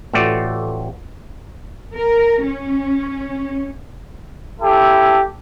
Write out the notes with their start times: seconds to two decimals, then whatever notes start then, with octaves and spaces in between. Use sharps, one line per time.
0.13 A1 A3 F4 F#4 D5
1.95 A#4
2.44 C#4
4.60 E4 G4 A4